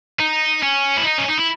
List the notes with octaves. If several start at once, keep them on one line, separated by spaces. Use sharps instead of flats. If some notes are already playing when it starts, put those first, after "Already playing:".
D#4
C#4
E4
D#4
C#4
D#4
E4